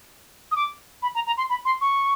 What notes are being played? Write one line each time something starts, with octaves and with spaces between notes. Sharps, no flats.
D#6
D6
B5
A#5
A#5
C6
B5
C6
C#6